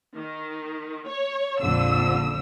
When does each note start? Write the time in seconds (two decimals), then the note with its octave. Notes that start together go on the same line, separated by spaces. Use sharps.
0.14 D#3
1.06 C#5
1.61 A#1 F2 D3 E6